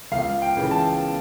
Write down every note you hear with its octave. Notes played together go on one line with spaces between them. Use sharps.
C#2 F5
G5
C#3 E3
A5